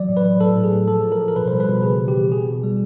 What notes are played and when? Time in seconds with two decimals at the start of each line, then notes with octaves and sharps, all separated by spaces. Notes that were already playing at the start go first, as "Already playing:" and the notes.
Already playing: E3 F#3 D5
0.08 A2
0.17 B4
0.24 F#3
0.41 A2 A4
0.56 A2
0.64 G#4
0.72 A2
0.88 F3 A4
1.04 F3
1.12 A#4
1.20 F3
1.28 A#4
1.35 B2 B4
1.48 G3 C5
1.60 B4
1.68 B2
1.83 C#3 G#4
2.00 E3
2.08 G4
2.15 E3
2.32 B2 G#4
2.47 B2
2.63 G3